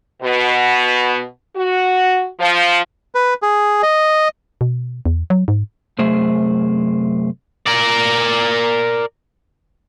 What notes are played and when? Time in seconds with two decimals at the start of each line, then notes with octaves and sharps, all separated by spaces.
0.23 B2
1.56 F#4
2.39 F3
3.15 B4
3.42 G#4
3.83 D#5
4.61 B2
5.05 E2
5.30 F#3
5.48 G#2
5.99 F#2 C3 A3 G#4 C5
7.67 A#4 D5